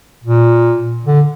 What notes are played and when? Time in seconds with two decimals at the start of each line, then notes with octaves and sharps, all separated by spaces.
0.24 A#2
1.06 D3